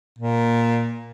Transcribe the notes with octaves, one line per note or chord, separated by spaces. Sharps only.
A#2